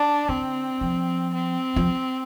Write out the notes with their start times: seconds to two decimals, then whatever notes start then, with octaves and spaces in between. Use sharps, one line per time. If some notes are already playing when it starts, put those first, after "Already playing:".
Already playing: D4
0.28 D3 C4
0.81 F3
1.34 C4
1.76 F3